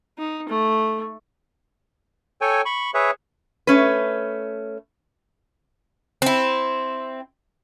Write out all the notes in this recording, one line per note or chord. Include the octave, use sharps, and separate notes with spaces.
D#4
A3
A4 C#5 G5 G#5
B5 C#6
G#4 B4 C#5 E5
A3 C#4 B4
C4 E4